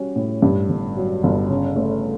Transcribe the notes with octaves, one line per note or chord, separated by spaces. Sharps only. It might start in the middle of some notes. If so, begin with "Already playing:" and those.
Already playing: G3 C#4 F#4
A2
G2
G1
F#3
G1
C#3
A3